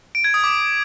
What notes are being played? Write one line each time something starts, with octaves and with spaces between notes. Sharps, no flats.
D7
G#6
D#6
D6